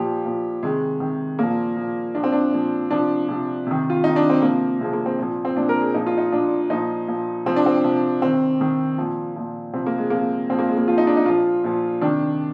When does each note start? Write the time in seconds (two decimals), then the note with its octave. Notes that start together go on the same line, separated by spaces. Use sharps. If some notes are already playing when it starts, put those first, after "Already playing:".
Already playing: A#2 F3 G4
0.25 A#2 F3
0.63 C3 D#3 G#3
1.00 C3 D#3
1.39 A#2 F3 A#3
1.77 A#2 F3
2.14 A#2 F3 D4
2.24 C4
2.32 D4
2.52 A#2 F3
2.91 C3 F3 D4
3.28 C3 F3
3.67 C3 D#3
3.90 F4
4.04 C3 D#3 D#4
4.16 D4
4.30 C4
4.42 C3 F3 A#3
4.80 C3 G#3
4.84 F3
4.93 A#3
5.06 C4
5.19 A#2 F3
5.45 C4
5.56 A#2 F3 D4
5.69 A#4
5.82 G#4
5.94 A#2 F3 D#4
6.07 F4
6.18 D#4
6.32 A#2 F3 D4
6.70 A#2 F3 D#4
7.08 A#2 F3
7.46 C3 F3 C4
7.56 D4
7.66 C4
7.84 C3 F3
8.22 C3 D#3 C4
8.60 C3 D#3
8.98 A#2 F3
9.36 A#2 F3
9.73 C3 F3 C4
9.86 A#3
9.98 G#3
10.10 C3 F3 A#3
10.50 A#2 F3 C4
10.59 A#3
10.69 G#3
10.78 A#3
10.88 A#2 F3 F4
10.98 D#4
11.07 D4
11.17 D#4
11.25 A#2 F3 F4
11.64 A#2 F3
12.01 C3 D#3 D4